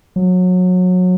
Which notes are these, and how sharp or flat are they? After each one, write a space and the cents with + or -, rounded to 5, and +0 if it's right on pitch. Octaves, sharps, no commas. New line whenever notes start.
F#3 -25